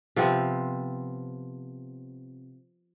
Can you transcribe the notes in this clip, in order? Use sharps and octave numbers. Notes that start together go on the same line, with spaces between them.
C3 F3 B3 C4